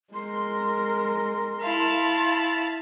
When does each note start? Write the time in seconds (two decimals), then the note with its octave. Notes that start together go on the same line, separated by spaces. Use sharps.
0.14 G#3 A#4 C6
1.62 E4 F5 A5 C6